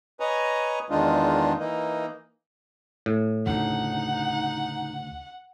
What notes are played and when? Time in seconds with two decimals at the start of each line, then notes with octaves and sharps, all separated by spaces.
0.20 B4 C#5 D#5 G#5 A#5
0.90 E2 D#3 G#3 D4 D#4 F4
1.59 E3 A#3 D#4
3.06 A2
3.46 D2 C#3 D#4 F#5